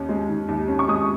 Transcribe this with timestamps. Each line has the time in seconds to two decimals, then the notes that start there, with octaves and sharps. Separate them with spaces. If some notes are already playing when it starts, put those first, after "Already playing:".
Already playing: D#2 C#4
0.09 G#3
0.28 D#3
0.48 D#2
0.68 C#4
0.79 C#6
0.88 G#3 D#6